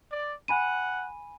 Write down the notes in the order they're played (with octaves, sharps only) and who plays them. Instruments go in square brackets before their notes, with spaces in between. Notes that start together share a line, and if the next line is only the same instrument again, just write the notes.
[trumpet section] D5
[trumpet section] F#5 [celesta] G#5 B5 D#7